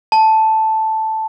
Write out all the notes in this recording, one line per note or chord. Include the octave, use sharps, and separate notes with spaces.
A5